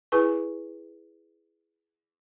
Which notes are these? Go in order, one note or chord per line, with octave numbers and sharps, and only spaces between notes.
E4 G#4 B4 G#5 C#6